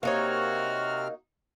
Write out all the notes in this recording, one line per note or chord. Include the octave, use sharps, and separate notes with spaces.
C3 A#3 C4 D#4 F#4 C#5 F6